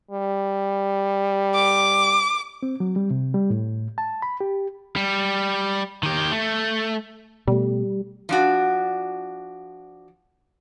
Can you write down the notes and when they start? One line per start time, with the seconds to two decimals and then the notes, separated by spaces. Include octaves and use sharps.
0.11 G3
1.55 D6
2.63 C4
2.80 F#3
2.96 G3
3.11 C3
3.34 G3
3.50 A2
3.98 A5
4.22 B5
4.41 G4
4.96 G3
6.03 D#3 G4
6.32 A3
7.47 B2 G3 A3
8.29 F3 D4 F#4